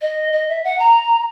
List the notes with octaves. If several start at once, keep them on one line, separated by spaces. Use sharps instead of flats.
D#5
D#5
E5
F#5
A#5